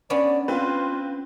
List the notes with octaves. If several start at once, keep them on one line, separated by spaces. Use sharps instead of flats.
B3 C#4 D4 D5
C4 F4 B4